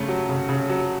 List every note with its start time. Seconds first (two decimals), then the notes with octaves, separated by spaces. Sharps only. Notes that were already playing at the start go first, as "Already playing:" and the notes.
Already playing: C#3 A3
0.08 F#3
0.29 C#3
0.49 C#3
0.70 F#3